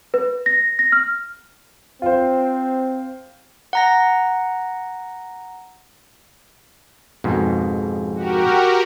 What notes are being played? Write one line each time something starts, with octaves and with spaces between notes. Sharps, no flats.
B4
A#6
A#6
F6
C4 F4 C5
F#5 A#5 A#6
F2 G#2 B2
F#4 G4 A#4